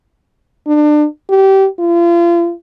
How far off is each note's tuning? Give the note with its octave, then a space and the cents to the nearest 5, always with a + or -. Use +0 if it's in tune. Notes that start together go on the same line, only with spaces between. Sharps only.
D4 +30
G4 -25
F4 -35